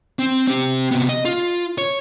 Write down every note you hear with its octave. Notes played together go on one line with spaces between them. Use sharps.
C4
C4 G4
C3 B3
D#5
F4
C#5